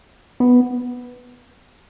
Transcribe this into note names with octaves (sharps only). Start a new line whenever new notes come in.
B3